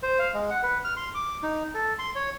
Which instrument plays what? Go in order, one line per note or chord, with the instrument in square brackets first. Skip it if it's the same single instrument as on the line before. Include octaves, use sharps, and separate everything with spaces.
[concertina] C5
F5
G#3
F#5
B4
F6
C6
D6
D#4
A4
C6
C#5